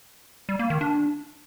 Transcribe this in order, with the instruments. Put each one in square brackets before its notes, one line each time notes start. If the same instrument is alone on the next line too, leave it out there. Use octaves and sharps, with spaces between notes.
[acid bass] G3
A#3
D#3
D4